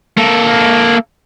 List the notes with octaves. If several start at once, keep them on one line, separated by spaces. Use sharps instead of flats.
A#3 A4